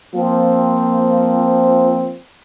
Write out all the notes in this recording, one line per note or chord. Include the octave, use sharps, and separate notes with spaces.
F3 A#3 C4